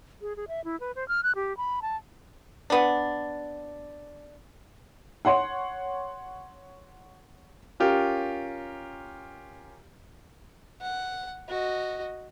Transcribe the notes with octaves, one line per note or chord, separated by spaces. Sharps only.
G#4
G#4
E5
E4
B4
C5
F6
F#6
G4
B5
A5
B3 D4
C#5 F#5 C6
C#4 F4 G4 A#4
F#5
F#4 D#5